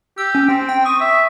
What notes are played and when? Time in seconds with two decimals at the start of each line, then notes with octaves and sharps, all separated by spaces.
0.18 G4 E6
0.35 C#4
0.49 C4 G5
0.69 G5
0.86 C#6 D#6
1.01 E5